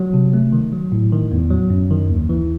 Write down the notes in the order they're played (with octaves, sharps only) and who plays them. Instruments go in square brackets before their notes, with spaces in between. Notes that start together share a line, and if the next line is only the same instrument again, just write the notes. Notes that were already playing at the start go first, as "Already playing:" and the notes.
Already playing: [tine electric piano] F#3
C3
A3
D#3
F#3
A2
D#3
E2
F#3
F#2
D#3
D#2
E3